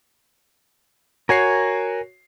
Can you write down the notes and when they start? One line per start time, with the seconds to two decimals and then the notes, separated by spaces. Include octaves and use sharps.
1.29 F#4 A#4 C#5 G#5 C7